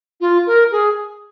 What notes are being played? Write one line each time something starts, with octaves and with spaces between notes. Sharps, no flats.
F4
A#4
G#4